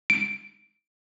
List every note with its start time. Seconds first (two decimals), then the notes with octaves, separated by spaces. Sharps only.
0.10 D7